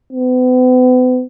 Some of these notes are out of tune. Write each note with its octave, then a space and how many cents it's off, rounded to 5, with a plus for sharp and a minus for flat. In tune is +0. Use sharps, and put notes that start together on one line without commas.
B3 +40